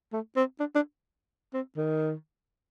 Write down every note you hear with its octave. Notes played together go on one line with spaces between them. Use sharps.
A3
C4
D4
D4
C4
D#3